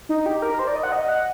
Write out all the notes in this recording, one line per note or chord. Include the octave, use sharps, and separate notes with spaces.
D#4
G4
A#4
C5
D5
D#5
F#5
D#5
F#5